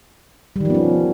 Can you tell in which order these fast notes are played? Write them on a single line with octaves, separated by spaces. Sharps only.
G3 D#3 F3 B3 C#4